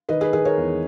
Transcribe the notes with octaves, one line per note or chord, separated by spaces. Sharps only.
D#3 B4 D#5
G#4 B4
D#3 G#4 B4
A#4 C#5
E2